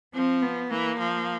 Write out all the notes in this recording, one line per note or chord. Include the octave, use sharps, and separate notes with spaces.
F3 C4
B3
E3 A#3
F3